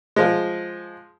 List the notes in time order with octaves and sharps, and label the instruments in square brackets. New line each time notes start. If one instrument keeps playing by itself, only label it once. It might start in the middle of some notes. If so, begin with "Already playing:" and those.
[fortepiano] F3 G#3